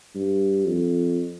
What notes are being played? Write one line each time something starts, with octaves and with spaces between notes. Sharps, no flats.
G2
F2